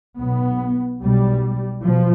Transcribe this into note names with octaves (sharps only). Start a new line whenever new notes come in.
B1 B2 B3
B1 B2 G3
B2 F3